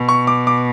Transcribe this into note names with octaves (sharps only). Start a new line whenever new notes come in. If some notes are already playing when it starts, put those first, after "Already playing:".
Already playing: B2
C#6
D6
D6